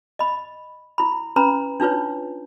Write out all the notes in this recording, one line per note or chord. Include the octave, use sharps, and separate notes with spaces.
D#5 B5
E4 B5
C#4 B4 A#5 B5
D4 D#4 F4 B4 C#5